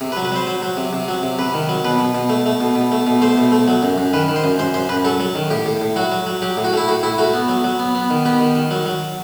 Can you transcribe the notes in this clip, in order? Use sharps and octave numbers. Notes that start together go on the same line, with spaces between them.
C3
B4
F#3
B4
F#3 C5
F#3
F#3
C3
C3
F#3
C3
C3 B4
D#3
F#3
B2 B4
B2
B2
A3
A3
B2
B2
A3
B2
A3 C5
B2
A3
F#3
F#2
F#2
D#3 B4
D#3
C5
F#2
F#2 C5
F#2 C5
F#2 B4
F#3 A4
F#3
D#3
A2 G4
A2
A2
F#3 F#4
F#3
F#3
F#3 G4
A2
F#4
A3 E4
A2 F#4
A2 E4
A3 F#4
B3
F#3
F#3
B3
B3
D#3
B3 G4
D#3
D#3
F#3
F#3